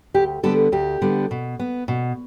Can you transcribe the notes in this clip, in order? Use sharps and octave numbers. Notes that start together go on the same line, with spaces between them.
D2 G4
D3 G3 B3 A4
D2 G4
D3 G3 B3
B2
B3
B2